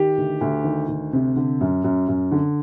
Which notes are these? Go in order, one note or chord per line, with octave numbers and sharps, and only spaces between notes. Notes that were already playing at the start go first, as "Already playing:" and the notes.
Already playing: D#3 G4
D2
D2
D#3
D2
C3
D3
F#2
F#2
F#2
D3